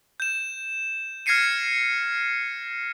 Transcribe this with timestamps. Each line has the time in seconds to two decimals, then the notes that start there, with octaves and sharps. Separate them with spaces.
0.20 G6 E7
1.26 F6 G#6 A#6 C7 C#7 D#7